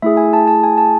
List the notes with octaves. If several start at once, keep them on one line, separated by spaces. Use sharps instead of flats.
A3 E4 G#4 E5
G#5
A5
A5
G#5
A5